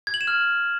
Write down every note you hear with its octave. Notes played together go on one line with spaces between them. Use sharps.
G#6
F#7
E7
F6